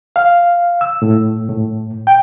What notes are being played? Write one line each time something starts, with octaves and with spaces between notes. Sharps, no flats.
F5
E6
A2
A2
G5